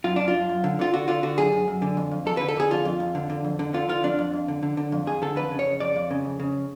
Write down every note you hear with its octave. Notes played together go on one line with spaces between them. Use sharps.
F#2 F4
F#2 D4
F4
F#2
F#2
D3
D3 F4
D3 F#4
D3 F4
D3 F#4
F#2 G#4
F#2
F#2
D3
F2
F2
F2 A4
D3 B4
A4
D3 G#4
F2 F4
F2
F2
D3
D3
F2
D3
D3 F4
D3 F4
F2 D4
F2
F2
D3
D3
D3
F2
F2 G#4
D3 A4
F2 B4
C#3
C#5
C#3
F2 D5
F2
C#3
F2
C#3